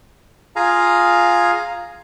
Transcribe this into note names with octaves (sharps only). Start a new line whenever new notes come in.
F4 G#4 F5 G#5 A#5